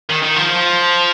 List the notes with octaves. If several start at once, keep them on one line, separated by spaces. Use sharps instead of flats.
D#3
D#3
F3